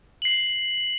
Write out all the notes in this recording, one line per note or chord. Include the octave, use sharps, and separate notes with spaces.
C7 F#7